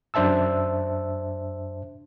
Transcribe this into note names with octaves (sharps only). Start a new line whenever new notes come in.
F#2 D4 C5 E5 A5 E6